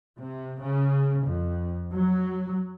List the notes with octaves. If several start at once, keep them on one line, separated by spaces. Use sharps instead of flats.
C3
C#3
F2
F#3